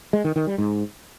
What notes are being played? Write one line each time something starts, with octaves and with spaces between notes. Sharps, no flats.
G#3
D#3
D#3
G3
G#2